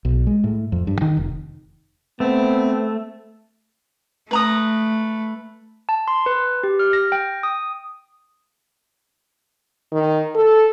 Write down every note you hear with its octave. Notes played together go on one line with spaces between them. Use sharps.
B1
G#3
A2
F2
G2
D#3
F1
A3 B3 C4
A3 B4 A#5 D#6
A5
C6
B4
G4
F6
A#6
G5
D#6
D#3
A4